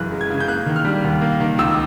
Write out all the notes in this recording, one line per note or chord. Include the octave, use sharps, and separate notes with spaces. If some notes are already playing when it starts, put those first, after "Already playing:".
Already playing: F#2 C#3 E3 G#3 F#6
G#3
G#6
C#3
G6
A#3 F#6
D#3
F6
G3
D#2
A#3
D#3
C#2 E6